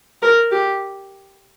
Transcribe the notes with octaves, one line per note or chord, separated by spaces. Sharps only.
A#4
G4